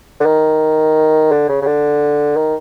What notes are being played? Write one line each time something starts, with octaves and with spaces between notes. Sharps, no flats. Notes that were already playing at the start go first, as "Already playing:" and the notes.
D3
D#3
D3
C#3
C#3
D3
D#3